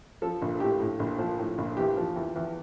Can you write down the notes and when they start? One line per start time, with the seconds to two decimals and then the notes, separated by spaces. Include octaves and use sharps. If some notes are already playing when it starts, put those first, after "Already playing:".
0.22 F3 A4
0.42 A#1
0.60 A2 G4
0.80 A2
0.99 A#1
1.18 F3
1.39 A2
1.58 A#1
1.77 E2 G4
1.97 F3
2.16 E2
2.36 E2